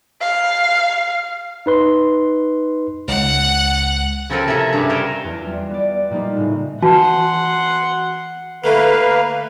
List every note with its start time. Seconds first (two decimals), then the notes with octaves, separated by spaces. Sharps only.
0.21 F5
1.66 D#4 B4 C6
3.08 C#2 F#5
4.30 C#3 F3 C4 A4 A#4 G#5
4.48 C3 E4 A4 E5
4.73 G2 C#3 G3 E4 F5
4.90 G4 A#4 C5 C#5 D#5 F5
5.24 E2
5.42 G3 F4
5.70 B3 D5
6.10 A#2 G3 A#3 D#4 F4
6.36 A2 C#3
6.83 E3 F#4 F#5 A5 C6
8.64 D3 A3 A#3 E4 B4 F5